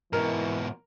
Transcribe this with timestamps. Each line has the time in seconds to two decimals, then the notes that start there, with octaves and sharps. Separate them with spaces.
0.13 G#2 B2 E3 A#4